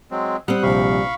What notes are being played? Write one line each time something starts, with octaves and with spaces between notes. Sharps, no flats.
F#3 G#3 C4
G3 C4 F#5 D#6 F#6
A#1 C3 F5 B5 C#6